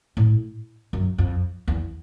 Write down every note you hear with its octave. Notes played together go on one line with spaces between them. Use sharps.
A2
F#2
F2
E2